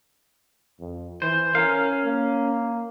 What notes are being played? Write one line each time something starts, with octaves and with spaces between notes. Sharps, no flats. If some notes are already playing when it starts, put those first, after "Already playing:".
F2
E3 C5
C#4 A#4 F5
A#3